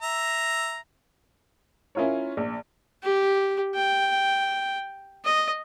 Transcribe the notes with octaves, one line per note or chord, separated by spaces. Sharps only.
E5 A#5
C#4 E4 F4 A#4 C#5
A#1
G4
G5
D#5